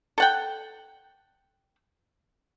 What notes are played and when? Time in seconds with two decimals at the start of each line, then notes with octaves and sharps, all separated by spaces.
0.18 A4 F#5 G5